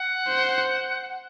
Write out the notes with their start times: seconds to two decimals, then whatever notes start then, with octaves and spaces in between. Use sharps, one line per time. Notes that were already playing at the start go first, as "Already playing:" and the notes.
Already playing: F#5
0.27 C5